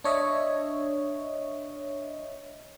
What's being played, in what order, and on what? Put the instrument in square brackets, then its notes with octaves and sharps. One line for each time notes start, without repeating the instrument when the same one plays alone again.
[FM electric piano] D4 C#5 D#5 E5